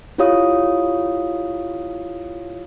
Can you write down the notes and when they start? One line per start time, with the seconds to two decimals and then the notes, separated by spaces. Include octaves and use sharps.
0.18 E4 F4 G4 C#5 F5 D#6